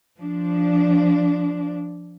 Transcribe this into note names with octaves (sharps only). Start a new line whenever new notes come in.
F3 D4